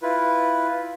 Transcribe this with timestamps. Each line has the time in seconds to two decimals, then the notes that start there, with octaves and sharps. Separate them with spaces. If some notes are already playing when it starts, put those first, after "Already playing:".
0.02 E4 F4 B4